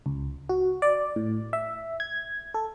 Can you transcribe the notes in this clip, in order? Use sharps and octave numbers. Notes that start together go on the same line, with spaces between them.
C#2
F#4
D5
A2
E5
G#6
A4